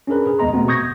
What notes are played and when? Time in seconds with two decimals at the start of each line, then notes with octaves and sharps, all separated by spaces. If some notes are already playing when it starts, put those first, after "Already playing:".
0.07 C#4 D4 G#4 A#4 B4
0.27 G#4
0.39 D#2 G#3 B3 D#5 A#5 C6
0.53 B2 A3 B3 C4 F#4
0.68 C#6 D#6 G6 G#6 A#6
0.80 A1